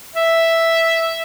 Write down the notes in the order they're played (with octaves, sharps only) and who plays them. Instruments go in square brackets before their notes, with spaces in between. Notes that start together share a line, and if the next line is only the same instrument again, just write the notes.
[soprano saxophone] E5